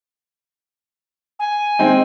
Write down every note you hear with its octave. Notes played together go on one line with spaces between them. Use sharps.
G#5
G#3 C4 D#4